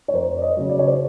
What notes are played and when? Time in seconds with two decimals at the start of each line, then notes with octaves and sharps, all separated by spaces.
0.08 C#5
0.13 F2 A#4 C5
0.36 D5
0.42 C#5 D#5
0.57 C#3 F#3
0.69 D5
0.79 C#5
0.87 C5 D5